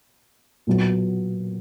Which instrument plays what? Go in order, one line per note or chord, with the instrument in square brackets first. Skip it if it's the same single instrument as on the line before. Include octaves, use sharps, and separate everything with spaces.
[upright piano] A#2 F#3 B3